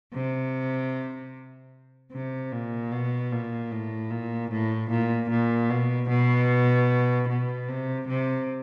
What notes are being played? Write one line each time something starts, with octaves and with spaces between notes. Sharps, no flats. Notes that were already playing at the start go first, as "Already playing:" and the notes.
C3
C3
A#2
B2
A#2
A2
A#2
A2
A#2
A#2
B2
B2
B2
C3
C3